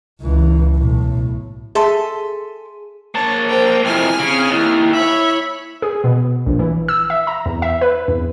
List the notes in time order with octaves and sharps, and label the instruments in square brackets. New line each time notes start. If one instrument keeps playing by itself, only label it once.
[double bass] C#2 E3
B1 A2
[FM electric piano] G#4 [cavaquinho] A4 E5 C6
[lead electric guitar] A#3 A5 [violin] C#5
[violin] A#4 G5 [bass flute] C5
[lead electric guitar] F2 C3 [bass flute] E4 [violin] G#5 F6
[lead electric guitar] C#3 [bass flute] C4
[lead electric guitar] D#2 [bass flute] E4
[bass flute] E4 [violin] C#5 B5 [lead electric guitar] E5
[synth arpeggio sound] G#4
B2
A#1
E3
E6
E5
A#5
E2
E5
B4
E2